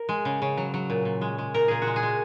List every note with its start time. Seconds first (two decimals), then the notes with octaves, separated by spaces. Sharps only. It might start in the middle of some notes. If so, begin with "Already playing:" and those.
Already playing: A#4
0.09 G#3
0.25 C#3
0.42 C#3
0.57 F#3
0.74 F#3
0.90 A#2
1.05 A#2
1.21 G#3
1.38 G#3
1.54 A#2 A#4
1.68 A#2 G#4
1.82 F#4
1.87 G#3
1.96 G#4
2.03 G#3